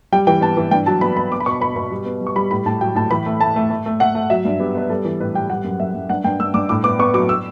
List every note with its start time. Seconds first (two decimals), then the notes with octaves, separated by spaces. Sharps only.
0.12 G3 G5
0.27 E3 G5
0.41 B3 A5
0.57 E3
0.71 G2 G5
0.86 F#3 A5
1.01 B3 B5
1.17 B3 B5
1.32 B3 D6
1.40 B5
1.46 B2 C#6
1.61 B2 B5
1.76 B2 B5
1.91 G3
2.06 B3
2.21 G3
2.27 C#6
2.36 G3 B5
2.51 A2 B5
2.66 A2 A5
2.81 F#3 G5
2.95 A2 A5
3.11 E3 B5
3.26 A3
3.40 A3 A5
3.56 A3
3.70 A3
3.86 A3
4.00 A3 F#5
4.15 A3
4.30 F#3 E5
4.45 G2
4.59 B3 G4
4.75 B3 B4
4.89 G3 A4
5.05 E3
5.20 A2 B4
5.34 G3 G5
5.50 G3 F#5
5.64 F#2
5.80 F#2 E5
5.94 F#2
6.09 G2 F#5
6.24 G2 G5
6.40 G2 E6
6.54 G2 D6
6.69 A2 D6
6.84 B3 D6
6.99 B3 C#6
7.14 F#3 D6
7.29 E6